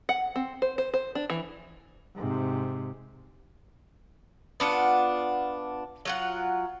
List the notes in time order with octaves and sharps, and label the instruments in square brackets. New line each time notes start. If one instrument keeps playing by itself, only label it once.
[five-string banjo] F#5
C4
C5
C5
C5
D4
E3
[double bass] G#2 C3
[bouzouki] B3 D4 F4 F#5
F#3 F4 F#5